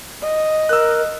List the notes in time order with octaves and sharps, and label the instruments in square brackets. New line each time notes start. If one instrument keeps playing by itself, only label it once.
[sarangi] D#5
[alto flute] A#4 [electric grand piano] E6 F#6